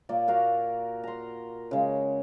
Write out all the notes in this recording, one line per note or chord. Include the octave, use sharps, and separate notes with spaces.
A#2 A#3 D5
F#4 A#4 F5
A#5 C6
C#3 G#3